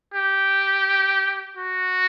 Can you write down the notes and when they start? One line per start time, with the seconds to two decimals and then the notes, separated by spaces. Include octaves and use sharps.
0.14 G4
1.57 F#4